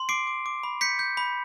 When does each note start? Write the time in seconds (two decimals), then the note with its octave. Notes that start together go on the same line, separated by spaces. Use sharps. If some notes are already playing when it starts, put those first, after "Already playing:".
Already playing: C6
0.09 D6 C7 D7
0.27 D6
0.46 D6
0.63 B5
0.81 G6 B6 C#7
0.99 G6
1.17 B5